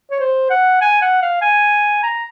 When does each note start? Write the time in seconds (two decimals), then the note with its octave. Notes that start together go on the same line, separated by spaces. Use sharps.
0.10 C#5
0.20 C5
0.50 F#5
0.81 G#5
1.02 F#5
1.22 F5
1.41 G#5
2.03 A#5